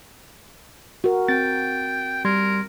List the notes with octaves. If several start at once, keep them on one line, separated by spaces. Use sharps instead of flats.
F#4 A#4
C4 G5 A6
G3 A#4 C6 G#6